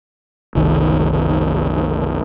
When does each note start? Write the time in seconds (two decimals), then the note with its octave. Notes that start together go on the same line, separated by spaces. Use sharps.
0.55 F#1 C2 D#3